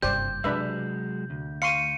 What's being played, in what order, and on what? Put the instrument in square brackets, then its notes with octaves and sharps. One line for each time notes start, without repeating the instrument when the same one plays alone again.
[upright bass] F#1 G2 [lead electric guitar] C2 [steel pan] G4 C5 D5 [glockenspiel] G6
[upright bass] C3 [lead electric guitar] F#3 G#3 [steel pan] D4 B4 E5
[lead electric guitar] D2
[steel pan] F5 C6 C#6 [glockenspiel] C#7 D#7